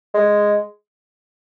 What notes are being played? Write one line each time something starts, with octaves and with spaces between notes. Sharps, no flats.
G#3